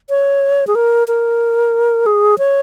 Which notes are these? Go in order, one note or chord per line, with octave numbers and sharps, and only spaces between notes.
C#5
G#4
A#4
A#4
G#4
C#5